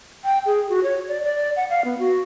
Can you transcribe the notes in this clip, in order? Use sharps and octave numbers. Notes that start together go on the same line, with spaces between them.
G5
G#4
F#4
C#5
D5
D5
F#5
F5
B3
F#4